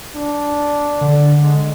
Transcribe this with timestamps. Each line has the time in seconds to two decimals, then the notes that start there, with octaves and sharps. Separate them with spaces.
0.15 D4
1.01 D3
1.42 G#3